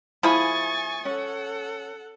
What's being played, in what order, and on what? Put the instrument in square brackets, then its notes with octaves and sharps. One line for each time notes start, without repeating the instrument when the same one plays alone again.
[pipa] F3 G#4 B5 [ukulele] E4 [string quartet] G#5 C#6 A6
[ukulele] C#4 [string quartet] A4 F#5